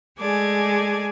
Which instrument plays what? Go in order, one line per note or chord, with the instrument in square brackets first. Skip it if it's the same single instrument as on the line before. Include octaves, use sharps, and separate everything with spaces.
[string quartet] G#3 A3 D5 G#5